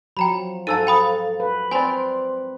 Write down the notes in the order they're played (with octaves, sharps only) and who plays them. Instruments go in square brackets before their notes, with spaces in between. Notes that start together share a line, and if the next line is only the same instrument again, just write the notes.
[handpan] F3 F#3 [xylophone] G5 A#5 B5
[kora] G#2 [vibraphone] A4 F5 [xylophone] A5 E6 D#7
[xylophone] G5 B5 D#6
[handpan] B4
[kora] C4 D5 [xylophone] G#5 B5 [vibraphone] C6